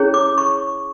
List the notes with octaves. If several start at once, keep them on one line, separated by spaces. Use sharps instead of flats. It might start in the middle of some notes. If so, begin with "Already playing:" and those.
Already playing: C#4 E4 G#4 C#5
D6
C#6